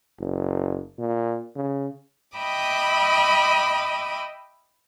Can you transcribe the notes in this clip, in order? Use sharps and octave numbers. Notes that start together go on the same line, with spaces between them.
F#1
A#2
C#3
D#5 E5 G5 B5 D6 D#6